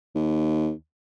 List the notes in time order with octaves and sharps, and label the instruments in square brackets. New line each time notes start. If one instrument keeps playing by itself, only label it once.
[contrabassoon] D#2